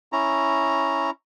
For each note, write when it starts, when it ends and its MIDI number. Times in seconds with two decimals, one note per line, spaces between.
0.12 1.10 61
0.12 1.10 64
0.12 1.10 82